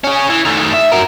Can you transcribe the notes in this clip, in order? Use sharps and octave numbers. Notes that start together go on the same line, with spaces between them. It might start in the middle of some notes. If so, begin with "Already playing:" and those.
C#4 G#4
E3
D#3 A3
E5
F#4 A#4